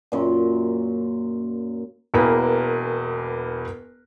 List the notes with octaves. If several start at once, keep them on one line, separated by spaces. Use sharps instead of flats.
F#2 A#2
E1 E2 A#3 A#4 B4